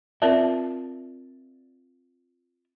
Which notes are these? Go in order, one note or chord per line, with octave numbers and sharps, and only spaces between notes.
C4 F4 A#4 D5 E5 A5